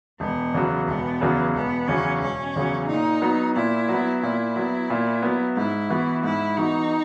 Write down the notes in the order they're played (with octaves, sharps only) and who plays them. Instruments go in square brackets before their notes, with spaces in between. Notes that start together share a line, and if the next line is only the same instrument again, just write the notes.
[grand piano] E1 [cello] B3
[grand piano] E2 C#3 F#3
[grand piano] E1 [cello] B3
[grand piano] E2 C#3 F#3
[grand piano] E1 [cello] B3
[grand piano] E2 C#3 F#3 [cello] C#4
[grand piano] E1 [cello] C#4
[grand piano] E2 C#3 F#3
[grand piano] A#2 [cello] D#4
[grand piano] F#3 B3
[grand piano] A#2 [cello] E4
[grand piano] F#3
B3
[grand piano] A#2 [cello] E4
[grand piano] F#3 B3
A#2
F#3 B3
[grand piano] G#2 [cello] E4
[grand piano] E3 B3 F#4
[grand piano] G#2 [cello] E4
[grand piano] E3 B3 F#4 [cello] D#4